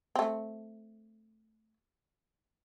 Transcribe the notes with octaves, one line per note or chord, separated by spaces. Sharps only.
A3 C4